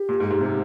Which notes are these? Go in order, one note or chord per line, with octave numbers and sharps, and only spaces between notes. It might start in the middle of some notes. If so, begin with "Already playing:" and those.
Already playing: G4
A#2
G#2
G#2
C3